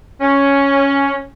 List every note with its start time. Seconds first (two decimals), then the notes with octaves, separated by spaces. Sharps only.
0.21 C#4